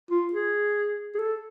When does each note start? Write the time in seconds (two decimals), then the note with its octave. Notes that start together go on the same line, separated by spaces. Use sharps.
0.11 F4
0.33 G#4
1.15 G#4
1.19 A4